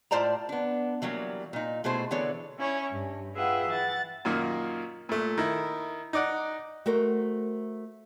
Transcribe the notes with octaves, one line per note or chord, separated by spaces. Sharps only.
A2 F4 C5 D5 A5 A#5
B3 D4
E3 F#3 G3 A#3
A#2 D#4
B2 A3 E4 G#4 C5 A5
D3 E3 B3 G#4 C#5 D5
C#4 E4 C#5
G2
F4 G#4 B4 E5 F#5 G5
E3 F#5 A6
F#2 A#2 D#3 A#3
A#2 A3
D#3 E4
D#4 D5 F#5
A3 F#4 A#4 C5